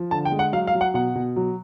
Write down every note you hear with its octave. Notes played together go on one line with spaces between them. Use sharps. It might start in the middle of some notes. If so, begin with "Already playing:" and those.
Already playing: F3
D3 A5
G5
G#3
F#5
F#3 F5
F5
F#3
F#5
B2 F#5
B2
F#3